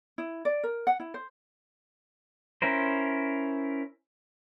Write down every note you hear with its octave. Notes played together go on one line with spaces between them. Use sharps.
E4
D5
A#4
F#5
E4
C5
C#4 E4 A#4 C5